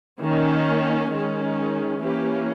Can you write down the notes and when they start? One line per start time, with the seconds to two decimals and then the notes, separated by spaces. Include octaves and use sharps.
0.21 D#3 A#3 C#4
1.13 D#3 G#3 C#4
2.03 E3 A#3 C#4 G4